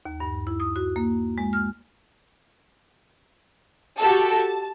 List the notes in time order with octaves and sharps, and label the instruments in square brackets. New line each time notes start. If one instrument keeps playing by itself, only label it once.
[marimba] D#2
G2
E4
D#6
F#4
A#3
G#3
F6
[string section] F#4 G4 A4 A5
A5